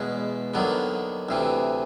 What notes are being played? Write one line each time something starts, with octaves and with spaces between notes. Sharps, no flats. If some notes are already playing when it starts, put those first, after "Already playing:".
Already playing: E2 B2 G#3
D#2 D3 F#3 B3
D2 C3 E3